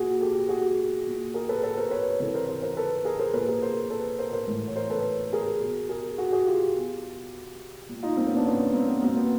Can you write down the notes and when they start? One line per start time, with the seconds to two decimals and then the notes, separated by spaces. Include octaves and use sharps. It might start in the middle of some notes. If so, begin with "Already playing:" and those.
Already playing: A#2 F#4 G#4
0.21 G4 A4
0.49 F#4 G#4
1.07 A#2
1.34 G#4 A#4
1.49 A4 B4
1.63 A4 B4
1.77 A#4 C5
1.91 B4 C#5
2.20 C3 E3 A4 B4
2.34 A#4 C5
2.48 A#4 C5
2.62 A#4 C5
2.77 A4 B4
3.05 G#4 A#4
3.19 A#4 C5
3.33 A#2 A4 B4
3.48 G#4 A#4
3.62 A#4 C5
3.90 A4 B4
4.19 A#4 C5
4.33 A#4 C5
4.47 A2 E3
4.67 C#5
4.76 A#4 C5
4.90 A4 B4
5.33 G#4 A#4
5.61 B2
5.89 G#4 A#4
6.18 F#4 G#4
6.32 F#4 G#4
6.46 F4 G4
6.75 B2
7.89 A#2
8.03 D#4 F4
8.17 A#3 C4
8.27 B3 C#4
8.36 C4 D4
8.46 B3 C#4
8.74 A#3 C4
8.88 B3
9.02 B2 A#3 C4
9.17 B3